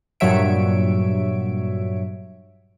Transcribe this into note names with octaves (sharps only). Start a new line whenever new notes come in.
G2 A#2 F#3 C#5 E5 D7